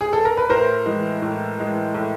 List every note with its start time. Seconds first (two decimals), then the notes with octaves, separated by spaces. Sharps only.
0.01 G#4
0.13 A4
0.25 A#4
0.37 B4
0.50 A2 A#4 C5
0.86 E3 G#3
1.22 A2
1.59 E3 G#3
1.94 A2